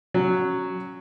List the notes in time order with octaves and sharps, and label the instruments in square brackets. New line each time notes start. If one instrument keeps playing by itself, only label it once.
[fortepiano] F#3 C#4